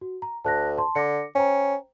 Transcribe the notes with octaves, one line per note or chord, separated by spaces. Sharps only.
F#4
A#5
D2 A5 F#6 A#6
A5 C6
D3 D6 A#6 C#7
C#4 C5 G5 A#5